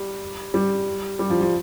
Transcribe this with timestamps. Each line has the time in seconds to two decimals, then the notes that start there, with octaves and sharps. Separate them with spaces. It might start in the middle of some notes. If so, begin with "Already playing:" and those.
Already playing: G3
0.54 G3
1.19 G3
1.30 F3
1.41 F3